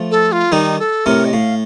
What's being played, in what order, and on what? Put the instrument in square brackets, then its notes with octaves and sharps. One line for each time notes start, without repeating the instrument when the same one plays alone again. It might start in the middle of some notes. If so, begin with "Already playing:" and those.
Already playing: [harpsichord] F3 A3
[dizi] A4
F4
[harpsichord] D#3 G3 [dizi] D#4
[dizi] A4
[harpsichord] A2 C3 [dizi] A#4
[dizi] D#5
[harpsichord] A2 [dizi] F5